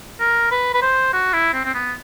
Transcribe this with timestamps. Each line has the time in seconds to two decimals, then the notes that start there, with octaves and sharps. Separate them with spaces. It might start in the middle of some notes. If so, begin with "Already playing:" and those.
0.20 A#4
0.51 B4
0.74 B4
0.82 C5
1.13 F#4
1.33 E4
1.53 C4
1.65 C4
1.74 B3